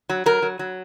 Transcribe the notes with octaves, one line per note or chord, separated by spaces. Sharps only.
F#3
F#3 A#4
F#3
F#3